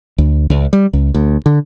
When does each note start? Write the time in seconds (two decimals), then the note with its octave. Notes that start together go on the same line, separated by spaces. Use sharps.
0.18 D2
0.50 C#2
0.73 G3
0.93 C#2
1.14 D2
1.46 D3